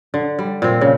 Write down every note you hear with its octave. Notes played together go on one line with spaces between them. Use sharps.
D3
G3
A#2 C4
C#3